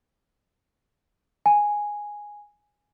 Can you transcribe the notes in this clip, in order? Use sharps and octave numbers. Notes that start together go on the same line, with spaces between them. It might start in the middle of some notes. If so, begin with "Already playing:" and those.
G#5